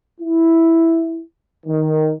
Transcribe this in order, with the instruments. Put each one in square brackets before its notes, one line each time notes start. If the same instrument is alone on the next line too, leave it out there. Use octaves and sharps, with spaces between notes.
[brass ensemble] E4
D#3